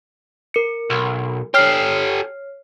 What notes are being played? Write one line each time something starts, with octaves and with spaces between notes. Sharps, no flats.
A#4 C#7
B1
G4 A4 C#5 F6 C7